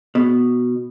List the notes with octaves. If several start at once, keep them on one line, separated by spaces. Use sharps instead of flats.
B2